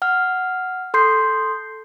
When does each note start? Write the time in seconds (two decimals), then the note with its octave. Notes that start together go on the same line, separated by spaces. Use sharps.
0.02 F#5 F6
0.94 A4 C6 G6 C7